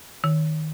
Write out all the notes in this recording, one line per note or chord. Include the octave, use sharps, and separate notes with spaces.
D#3